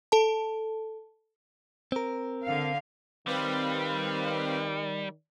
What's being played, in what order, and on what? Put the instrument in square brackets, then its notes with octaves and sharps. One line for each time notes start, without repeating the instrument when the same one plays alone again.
[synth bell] A4 A5
[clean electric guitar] C4 A#4
[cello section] D3 F5
[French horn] D#3 [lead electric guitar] G3 [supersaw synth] C4 B4 F5